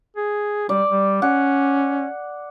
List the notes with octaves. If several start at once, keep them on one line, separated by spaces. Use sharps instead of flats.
G#4
G3 D5
G3
C#4 F#5